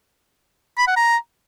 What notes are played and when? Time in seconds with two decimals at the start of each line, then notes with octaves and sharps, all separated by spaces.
0.78 B5
0.87 F#5
0.96 A#5